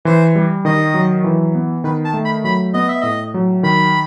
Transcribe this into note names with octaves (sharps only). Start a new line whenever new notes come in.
E3 C5
G3
D#3 D#5
F#3
E3
B3
D#3 B4
A5
A3
B5
F#3 B5
B3 D#5
E5
A2 D#5
F#3
D#3 B5